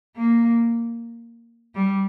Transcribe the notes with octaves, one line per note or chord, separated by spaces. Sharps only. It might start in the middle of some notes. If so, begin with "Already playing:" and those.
A#3
G3